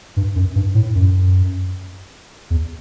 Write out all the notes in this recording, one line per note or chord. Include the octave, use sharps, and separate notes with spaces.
G2
F#2
G2
A2
F#2
E2